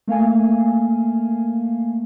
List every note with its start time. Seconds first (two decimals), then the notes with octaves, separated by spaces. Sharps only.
0.07 A3 A#3 F5 G#5